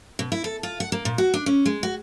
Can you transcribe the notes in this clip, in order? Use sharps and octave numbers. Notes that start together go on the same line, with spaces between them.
B2
E4
A4
F4
F#5
A#3
A#2
F#4
D4
C#4
G#3
F#4